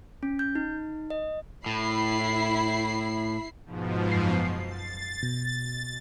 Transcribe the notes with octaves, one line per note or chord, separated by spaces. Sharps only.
C#4
G6
D#4
D#5
A2 E4 B5 C7
G#2 B2 F3
F#2 C7
A6
B2